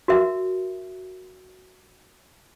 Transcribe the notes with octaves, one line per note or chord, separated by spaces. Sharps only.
F#4 A#4 E5